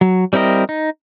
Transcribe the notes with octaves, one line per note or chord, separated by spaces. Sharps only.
F#3
G3 C4 E4 A#4 D#5
D#4